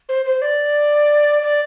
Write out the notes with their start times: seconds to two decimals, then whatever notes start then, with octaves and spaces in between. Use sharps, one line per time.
0.09 C5
0.25 C5
0.42 D5
1.43 D5